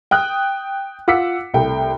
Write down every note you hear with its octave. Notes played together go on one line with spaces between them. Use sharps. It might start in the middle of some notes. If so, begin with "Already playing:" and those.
G5 D#6 F#6
F4 F#5 D6 E6 B6 C#7
C2 A3 G5